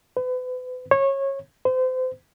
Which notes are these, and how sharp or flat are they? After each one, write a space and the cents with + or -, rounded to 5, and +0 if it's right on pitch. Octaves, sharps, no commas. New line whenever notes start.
B4 +40
C#5 -20
C5 -30